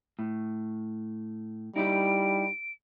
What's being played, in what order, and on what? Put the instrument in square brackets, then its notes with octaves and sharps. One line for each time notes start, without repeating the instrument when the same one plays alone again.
[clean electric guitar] A2
[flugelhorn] G3 [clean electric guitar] D#4 E4 G4 [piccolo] D7